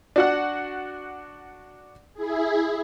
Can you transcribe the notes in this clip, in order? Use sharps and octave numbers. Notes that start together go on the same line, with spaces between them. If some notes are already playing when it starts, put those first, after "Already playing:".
D4 F#4 F#5
E4 G#4